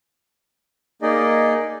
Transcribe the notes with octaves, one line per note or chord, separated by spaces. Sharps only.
A#3 D#4 G#4 D5 D#5